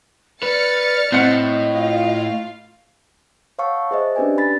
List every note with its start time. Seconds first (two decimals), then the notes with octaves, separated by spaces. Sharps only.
0.43 B4 D5 F6 A6 C#7
1.12 A2 C4 D#5 F#5
1.72 F4 F5
3.59 C#5 F5 F#5 A5 C#6 E6
3.91 G#4 C5 D#5 E5
4.16 C#4 D4 G4 B4 D5 G#5
4.38 B5 A6 B6